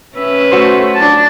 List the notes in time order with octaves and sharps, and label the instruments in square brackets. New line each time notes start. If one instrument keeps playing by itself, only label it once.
[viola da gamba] C#4 B4 [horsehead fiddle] E5
[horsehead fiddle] A3 [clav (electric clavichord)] F#4 C5
[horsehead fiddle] D4 A5